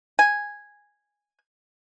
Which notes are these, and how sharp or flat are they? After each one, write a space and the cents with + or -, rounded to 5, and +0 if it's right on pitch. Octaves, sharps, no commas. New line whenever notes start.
G#5 -5